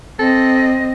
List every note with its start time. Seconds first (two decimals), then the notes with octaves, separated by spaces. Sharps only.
0.19 C4 A4 D#5